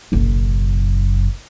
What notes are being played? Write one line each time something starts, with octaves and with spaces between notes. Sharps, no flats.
F#1 B1